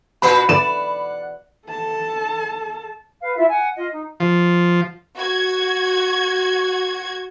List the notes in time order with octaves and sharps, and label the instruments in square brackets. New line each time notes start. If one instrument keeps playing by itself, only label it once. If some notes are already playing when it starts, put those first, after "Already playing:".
[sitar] A#2 F#4 B4 [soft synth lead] F#5 [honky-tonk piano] B5
[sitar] D5 [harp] E7
[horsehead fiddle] A4 A5
[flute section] B4 F5
E4 F4 E5
F#5 G#5
F4 D#5
D#4
[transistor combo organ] F3
[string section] F#4 G#6